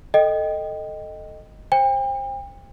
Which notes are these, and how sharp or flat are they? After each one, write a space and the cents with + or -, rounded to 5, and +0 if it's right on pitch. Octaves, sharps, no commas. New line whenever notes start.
A4 +0 D#5 +0 G5 +0
C5 +20 G5 +35